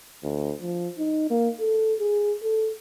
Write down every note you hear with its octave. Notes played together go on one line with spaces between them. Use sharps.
D2
F3
D#4
A#3
A4
G#4
A4